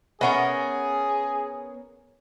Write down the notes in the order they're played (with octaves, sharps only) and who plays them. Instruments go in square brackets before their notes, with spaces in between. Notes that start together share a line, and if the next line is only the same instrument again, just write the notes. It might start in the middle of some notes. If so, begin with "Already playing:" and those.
[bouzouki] B3 C#4 A#4 [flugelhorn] G#4 [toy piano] E5 F#5